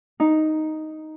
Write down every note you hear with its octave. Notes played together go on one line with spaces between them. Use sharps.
D#4